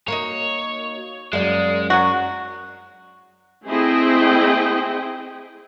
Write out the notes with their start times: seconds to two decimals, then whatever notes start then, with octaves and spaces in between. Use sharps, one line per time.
0.08 A#3 D#4 F#4 C#5 F5
1.33 F#2 G#3 A#3 D5
1.90 F#3 F#4 D5
3.67 A3 C4 E4 G#4 D#5 G5